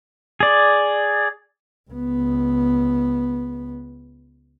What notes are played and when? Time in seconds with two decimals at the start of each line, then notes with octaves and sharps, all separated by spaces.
0.40 G#4 D5
1.91 C#2 B3